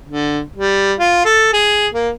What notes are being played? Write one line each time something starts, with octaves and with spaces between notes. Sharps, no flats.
D3
G3
F4
A4
G#4
A#3